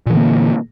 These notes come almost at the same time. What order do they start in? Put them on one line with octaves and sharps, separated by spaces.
A#2 E3 D3 A#3